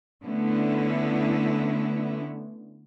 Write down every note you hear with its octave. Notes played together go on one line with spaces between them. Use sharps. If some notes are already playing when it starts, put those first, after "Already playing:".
D3 A3 B3 C#4 E4